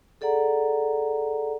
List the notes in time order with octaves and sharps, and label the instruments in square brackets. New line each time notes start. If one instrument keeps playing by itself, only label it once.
[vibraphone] G#4 A4 D5 F#5 A#5